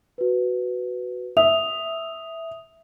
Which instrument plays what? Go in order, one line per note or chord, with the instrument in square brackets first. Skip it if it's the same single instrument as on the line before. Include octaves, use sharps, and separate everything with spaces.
[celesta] F#4 B4
[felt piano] E5 [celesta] D#6 F7